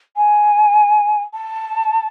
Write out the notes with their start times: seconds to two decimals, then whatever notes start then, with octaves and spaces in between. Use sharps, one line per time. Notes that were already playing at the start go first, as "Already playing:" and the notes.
0.16 G#5
1.33 A5